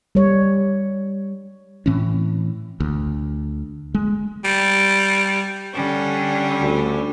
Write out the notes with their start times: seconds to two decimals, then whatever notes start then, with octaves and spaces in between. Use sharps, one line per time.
0.15 G3 C#5
1.86 A2 E3 C4 C#4
2.80 D2
3.95 G#3
4.44 G3
5.74 D3 G3 C#4
6.61 D2